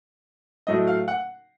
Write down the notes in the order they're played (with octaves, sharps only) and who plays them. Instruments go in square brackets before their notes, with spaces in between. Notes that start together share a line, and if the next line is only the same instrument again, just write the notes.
[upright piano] A2 F#3 A3 D#5
F5
F#5